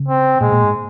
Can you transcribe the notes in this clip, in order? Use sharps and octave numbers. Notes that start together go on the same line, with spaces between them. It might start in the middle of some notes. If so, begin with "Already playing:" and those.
Already playing: C#3
C4
A#2 G#3
A#2
G#2